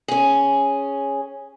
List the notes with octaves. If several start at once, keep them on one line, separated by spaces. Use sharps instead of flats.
C#4 G#4